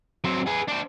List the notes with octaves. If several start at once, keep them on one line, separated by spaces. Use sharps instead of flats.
F#3 C4
G#4 B4
D4 C5